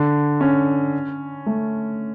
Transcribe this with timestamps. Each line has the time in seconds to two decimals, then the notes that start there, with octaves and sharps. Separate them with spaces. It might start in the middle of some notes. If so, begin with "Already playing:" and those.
Already playing: D3
0.41 C#4
1.46 A3